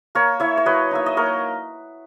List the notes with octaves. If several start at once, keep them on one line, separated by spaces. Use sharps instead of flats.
A#3 A#4 C#5
E4 C#5 E5
C#5
F#3 B4 D#5
A#3 D#4 E5
D#5
A#3 A#4 C#5